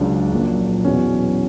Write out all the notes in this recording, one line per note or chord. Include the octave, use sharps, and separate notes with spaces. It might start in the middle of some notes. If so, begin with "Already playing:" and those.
Already playing: C#2 C#3 F#3 D4
A#1 A#2 F#3
E2 B2 F#3 C#4